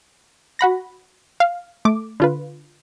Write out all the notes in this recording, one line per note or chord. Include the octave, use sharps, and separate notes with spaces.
F#4 F#5 B5 A#6
F5
A3 D6
D3 F4 B4